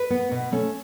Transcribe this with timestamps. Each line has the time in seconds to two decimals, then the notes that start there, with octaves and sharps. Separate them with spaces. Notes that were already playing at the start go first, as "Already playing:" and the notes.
Already playing: B4
0.10 B3
0.31 B2
0.52 A3 C#4